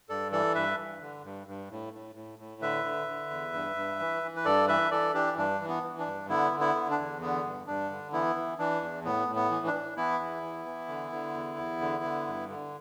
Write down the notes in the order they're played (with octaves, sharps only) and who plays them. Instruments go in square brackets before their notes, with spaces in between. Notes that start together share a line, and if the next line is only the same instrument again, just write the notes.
[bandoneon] G2 A4 D5
E3 A4 D5
G2 B4 E5
G2
D3
G2
G2
A2
A2
A2
A2
D3 B4 E5
D3
D3
E2
G2
G2
E3
E3
B4
G2 A4 D5
E3 B4 E5
E3 A4 D5
E3 D4 G4
G2 D4
E3
B3
E3
D4
G2
D3 B3 E4
D3
B3 E4
D3
D4
E2
D3 B3
G2
G2 D4
D3
E3 B3 E4
E3
E3 D4
E2
A2 B3
A2
B3
E3
D4
E3
E3 B3 E4
E2
E3
E3
D3
D3
E2
E2
D3
D3
G2
D3